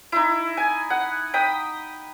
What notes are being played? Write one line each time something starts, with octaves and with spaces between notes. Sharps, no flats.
D#4 E4
G#5
F#5
G5 B5 D#6